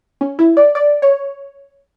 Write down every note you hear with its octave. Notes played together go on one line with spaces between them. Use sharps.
C#4
E4
D5
D5
C#5